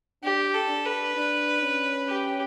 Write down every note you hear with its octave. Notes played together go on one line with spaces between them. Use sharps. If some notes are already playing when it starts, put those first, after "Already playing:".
D4 G4
A4
D4
B4
D4
C#4
G4